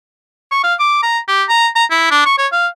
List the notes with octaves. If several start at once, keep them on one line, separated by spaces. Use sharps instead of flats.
C#6
F5
D6
A#5
G4
A#5
A#5
E4
D4
C#6
C#5
F5